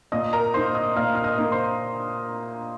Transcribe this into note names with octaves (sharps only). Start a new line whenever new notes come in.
A#2 D#5 D#6
A#4 A#5
A#3 D#4 C5 C6
D#5 D#6
A#2 F5 F6
F6
D#5 D#6
A#3 D#4
C5 C6